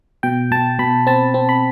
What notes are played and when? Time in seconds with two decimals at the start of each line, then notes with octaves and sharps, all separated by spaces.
0.23 B2 G5
0.51 B2 A5
0.79 B2 B5
1.07 C4 A5
1.34 C4
1.49 B5